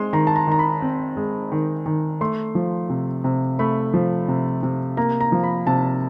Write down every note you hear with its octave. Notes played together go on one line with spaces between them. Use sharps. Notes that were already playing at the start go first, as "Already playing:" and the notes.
Already playing: G#3 C4 C6
D#3 A#5
A5
A#5
D#3 A#5
B5
C4
G#3
D#3
D#3
A3 C6
F3
C3
C3
A3 B5
F3
C3
C3
A#3 A#5
A#5
F3
B5
C3 A5